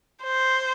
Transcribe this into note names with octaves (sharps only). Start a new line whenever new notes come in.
C5